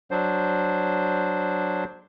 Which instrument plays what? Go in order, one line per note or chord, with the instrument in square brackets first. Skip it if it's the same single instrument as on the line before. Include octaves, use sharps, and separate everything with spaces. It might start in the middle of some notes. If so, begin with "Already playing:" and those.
[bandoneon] F#3 D4 C5